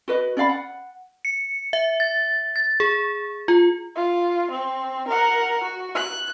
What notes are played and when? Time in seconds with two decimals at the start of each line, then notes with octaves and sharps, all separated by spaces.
0.08 F#4 B4 D#5
0.37 C#4 D5 F5 B5
0.49 F#5
1.25 C#7
1.73 E5
2.00 A6
2.56 A6
2.80 G#4
3.48 F4
3.96 F4
4.50 C4
5.08 A#4 F#5
5.63 F#4
5.95 F#6